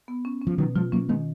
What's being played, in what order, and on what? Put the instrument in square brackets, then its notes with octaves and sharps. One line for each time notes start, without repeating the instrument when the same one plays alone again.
[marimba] B3
C#4
C#4
[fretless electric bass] F3
[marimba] B2 [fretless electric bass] D#3 F#3
[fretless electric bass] F3 G#3 [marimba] F4
[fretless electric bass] F#3 A#3 [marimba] C#4
[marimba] D#3 [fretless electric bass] G#3 B3